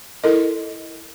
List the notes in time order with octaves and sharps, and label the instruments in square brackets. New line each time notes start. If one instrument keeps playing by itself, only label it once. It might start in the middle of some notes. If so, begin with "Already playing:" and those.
[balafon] E4 A4 A#4 D#5